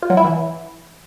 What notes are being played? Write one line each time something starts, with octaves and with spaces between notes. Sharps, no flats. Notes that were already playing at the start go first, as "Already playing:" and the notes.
F4
F#3
E4
E3